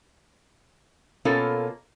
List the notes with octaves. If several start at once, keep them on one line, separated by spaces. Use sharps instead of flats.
B2 A#3 C#4 F4 A4